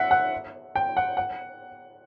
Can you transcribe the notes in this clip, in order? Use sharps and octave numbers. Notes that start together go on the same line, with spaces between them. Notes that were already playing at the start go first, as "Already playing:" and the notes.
Already playing: E5 F#5
F#5
G5
F#5
F#5